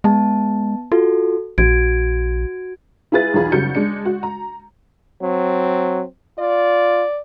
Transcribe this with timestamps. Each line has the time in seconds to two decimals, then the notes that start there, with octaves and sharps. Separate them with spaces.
0.04 G#3 B3 A5
0.92 F4 F#4 A4
1.58 A#1 F#4 G#6 D7
3.12 E4 F4 G#4 B4 A6
3.34 B1 E2 F4 G#4 B5
3.52 F#1 C#3 G3 F#4 G6 C#7
3.75 G#3 D4 C#7
4.05 F#4
4.23 A#5
5.22 F#3 C4
6.39 F4 D5